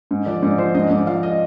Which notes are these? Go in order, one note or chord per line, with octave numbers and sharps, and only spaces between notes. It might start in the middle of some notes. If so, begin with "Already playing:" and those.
G#2
F3 D5
G#2 D5
F3 C5
G#2 D#5
G#2 D5
F3 F5
D#5